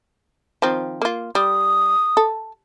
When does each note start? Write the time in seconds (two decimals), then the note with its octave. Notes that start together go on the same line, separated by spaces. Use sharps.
0.62 D#3 F3 C4
1.02 A#3 F4
1.35 G3 D#6
2.17 A4